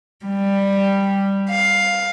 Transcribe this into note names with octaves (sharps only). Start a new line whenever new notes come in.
G3
F5